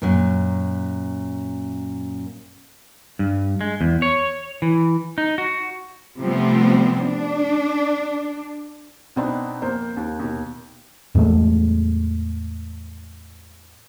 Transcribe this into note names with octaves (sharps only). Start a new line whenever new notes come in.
F#2 A#2
G2
G#3
E2
C#5
E3
D#4
F#4
C3 F3 G3 A3 B3 C4
D4
B2 B3 C4 D4 D#4
F2 A#3 C5
D#2
D#2 B2
E2 A2 G#3 A3